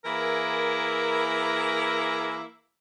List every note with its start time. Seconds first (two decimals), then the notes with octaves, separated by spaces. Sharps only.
0.05 E3 A#3 E4 G#4 A#4